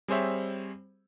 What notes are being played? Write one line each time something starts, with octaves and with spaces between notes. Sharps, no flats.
G3 C4 G#4 C5 C#5 E5